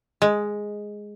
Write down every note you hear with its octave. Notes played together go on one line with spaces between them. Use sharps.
G#3